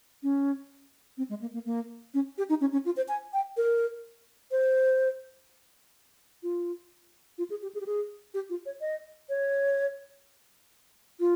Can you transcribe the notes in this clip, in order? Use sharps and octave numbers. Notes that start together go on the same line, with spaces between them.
C#4
C4
G#3
A#3
A#3
A#3
C#4
G4
D#4
C#4
C#4
F4
C5
G#5
G5
A#4
C5
F4
F4
G#4
G4
G#4
G4
G#4
G4
F4
C#5
D#5
C#5
F4